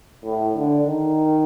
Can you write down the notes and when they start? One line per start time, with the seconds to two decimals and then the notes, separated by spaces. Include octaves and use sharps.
0.24 A2
0.56 D3
0.87 D#3